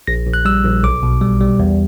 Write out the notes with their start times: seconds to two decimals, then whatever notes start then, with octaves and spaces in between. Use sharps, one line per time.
0.07 A#1 A#6
0.27 A#1
0.34 F#6
0.45 G3 E6
0.65 A#1
0.83 B1 D6
1.03 B2
1.22 G3
1.41 G3
1.60 E2